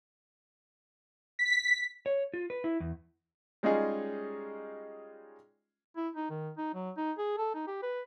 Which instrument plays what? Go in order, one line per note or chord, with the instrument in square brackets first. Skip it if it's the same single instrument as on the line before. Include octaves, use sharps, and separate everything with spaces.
[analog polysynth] B6
[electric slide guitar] C#5
F4
B4
E4
E2
[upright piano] G3 G#3 C#4 D#4 F4 G#4
[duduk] E4
D#4
D#3
D#4
F#3
D#4
G#4
A4
D#4
G4
B4